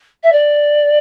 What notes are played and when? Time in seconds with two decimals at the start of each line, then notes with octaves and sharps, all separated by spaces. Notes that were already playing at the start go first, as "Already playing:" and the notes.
0.23 E5
0.32 D5